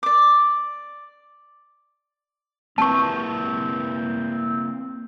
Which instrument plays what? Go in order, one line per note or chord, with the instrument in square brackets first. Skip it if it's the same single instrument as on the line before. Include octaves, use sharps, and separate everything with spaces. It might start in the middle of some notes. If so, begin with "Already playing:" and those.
[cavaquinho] D5 D6
[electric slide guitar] A#3 E4 B4 [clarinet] C4 [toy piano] A5 C#6